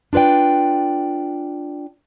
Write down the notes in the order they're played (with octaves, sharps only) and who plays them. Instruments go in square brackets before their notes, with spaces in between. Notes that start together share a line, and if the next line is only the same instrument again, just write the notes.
[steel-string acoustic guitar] D4 F4 B4 D5 G5